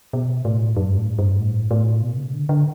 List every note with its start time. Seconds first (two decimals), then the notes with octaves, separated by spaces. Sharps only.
0.13 B2
0.45 A2
0.76 F#2
0.89 G2
0.97 A2
1.19 G2
1.39 A2
1.71 A2
2.02 B2
2.17 C#3
2.34 D3
2.49 D3